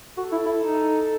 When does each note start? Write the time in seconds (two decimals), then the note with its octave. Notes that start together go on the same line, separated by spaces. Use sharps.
0.17 F#4 A4
0.32 E4
0.46 E4
0.61 D#4